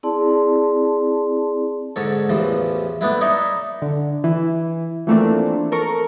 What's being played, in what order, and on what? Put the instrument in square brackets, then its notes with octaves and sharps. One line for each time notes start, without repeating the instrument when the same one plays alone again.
[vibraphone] C4 E4 G#4 D5 A5 C6
[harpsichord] G#2 D3 A4 C#5
A1 E2 E3 F3
A3 B3 D4 E4
D#4 C#5 D5 E5
[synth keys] D3
E3
E3 F3 A3 A#3 C4 D4
A4 A#4 C#6